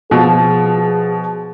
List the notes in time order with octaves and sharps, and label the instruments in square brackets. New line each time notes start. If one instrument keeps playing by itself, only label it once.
[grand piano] B2 F3 [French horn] G#4